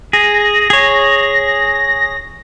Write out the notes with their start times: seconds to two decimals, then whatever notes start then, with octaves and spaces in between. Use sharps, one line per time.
0.13 G#4 A#6
0.70 G#4 C#5